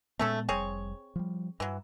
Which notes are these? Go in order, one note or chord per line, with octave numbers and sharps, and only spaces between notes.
A#2 G#3 A3 B3 C#4 A4
F1 G3 C4 G#4 C#5
F3 G3
G2 E3 F#3